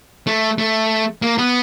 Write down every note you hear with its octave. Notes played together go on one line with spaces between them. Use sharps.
A3
A3
A#3
B3